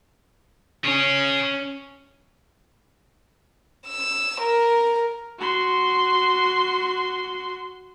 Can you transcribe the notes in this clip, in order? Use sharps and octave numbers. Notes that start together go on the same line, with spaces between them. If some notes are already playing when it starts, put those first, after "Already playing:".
C#4 G#4 C#5
E6
A#4
F#4 C6